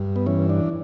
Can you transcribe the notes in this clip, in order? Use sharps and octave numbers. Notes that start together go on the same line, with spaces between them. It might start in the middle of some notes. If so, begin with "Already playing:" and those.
Already playing: G2
B3
E3 C#4
D4